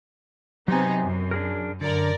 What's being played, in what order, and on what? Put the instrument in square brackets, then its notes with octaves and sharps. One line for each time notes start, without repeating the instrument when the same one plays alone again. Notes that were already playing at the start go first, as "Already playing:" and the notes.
[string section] C3 B3 D#4 [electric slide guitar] F#3 G#5
[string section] F#2
[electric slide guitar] D4 G#4 A#4
[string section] F#2 A#4 D5 [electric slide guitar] D3